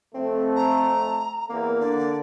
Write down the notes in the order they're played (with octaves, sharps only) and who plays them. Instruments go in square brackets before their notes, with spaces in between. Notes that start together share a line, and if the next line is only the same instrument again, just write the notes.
[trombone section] F2 A3 [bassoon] C4
[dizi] A#5
[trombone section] E2 A#4 [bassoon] A#3
[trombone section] D3 [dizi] D5